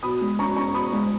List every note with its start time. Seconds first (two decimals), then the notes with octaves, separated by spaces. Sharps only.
0.03 B2 B5 D#6
0.21 G#3
0.39 C#4 A#5 C#6
0.56 C#4 A#5 C#6
0.74 B2 B5 D#6
0.92 G#3